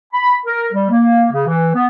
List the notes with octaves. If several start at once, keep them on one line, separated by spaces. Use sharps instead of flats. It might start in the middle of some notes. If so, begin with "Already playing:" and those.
B5
A#4
G3
A#3
C#3
E3
B3